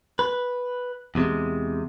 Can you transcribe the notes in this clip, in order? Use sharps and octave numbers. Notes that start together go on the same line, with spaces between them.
B4
E2 C3 G#3